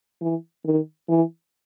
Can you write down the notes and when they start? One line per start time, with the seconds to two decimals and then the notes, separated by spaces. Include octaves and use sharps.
0.21 E3
0.65 D#3
1.08 E3